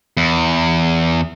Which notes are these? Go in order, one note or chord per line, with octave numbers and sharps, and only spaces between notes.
E2